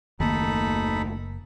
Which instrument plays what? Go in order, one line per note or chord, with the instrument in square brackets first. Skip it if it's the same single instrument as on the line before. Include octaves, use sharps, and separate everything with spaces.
[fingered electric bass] F#1 A#3 [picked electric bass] D#2 D#3 A3 [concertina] D#4 A4 B5